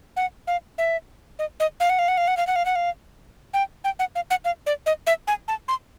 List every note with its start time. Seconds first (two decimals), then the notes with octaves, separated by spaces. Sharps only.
0.16 F#5
0.47 F5
0.78 E5
1.39 D#5
1.60 D#5
1.80 F5
1.90 F#5
1.99 F5
2.08 F#5
2.17 F5
2.28 F#5
2.37 F5
2.47 F#5
2.56 F5
2.66 F#5
2.76 F5
3.54 G5
3.84 G5
3.99 F#5
4.15 F5
4.30 F#5
4.45 F5
4.66 D5
4.86 D#5
5.07 E5
5.27 G#5
5.48 A5
5.68 C6